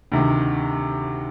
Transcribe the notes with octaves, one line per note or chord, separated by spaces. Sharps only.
D2 C3 D#3